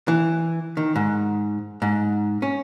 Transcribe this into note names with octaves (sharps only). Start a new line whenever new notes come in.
E3
D#3
G#2
G#2
C#4